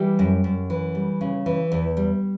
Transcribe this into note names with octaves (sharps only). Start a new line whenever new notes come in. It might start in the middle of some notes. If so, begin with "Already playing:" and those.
Already playing: E3 G3 G4
F#2
F#2
E3
G3
C#3
E3
E2
G3